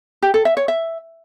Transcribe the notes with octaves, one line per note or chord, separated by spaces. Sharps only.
G4
A4
E5
C#5
E5